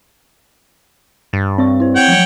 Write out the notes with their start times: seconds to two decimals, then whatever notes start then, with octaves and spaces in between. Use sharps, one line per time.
1.33 G2 A6
1.58 C4 C#5 D5 C#6
1.80 E4 C5
1.96 C#5 F#5 G5
2.08 F3 F#3